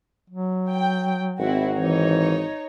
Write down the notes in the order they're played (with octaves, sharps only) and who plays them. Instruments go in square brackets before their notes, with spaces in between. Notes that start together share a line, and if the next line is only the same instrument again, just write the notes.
[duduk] F#3
[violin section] G5
[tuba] G#1 [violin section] C4 E4 F#4
[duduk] E3 [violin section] D#4 C#5